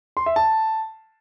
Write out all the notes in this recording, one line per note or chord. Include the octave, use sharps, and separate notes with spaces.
C6
E5
A5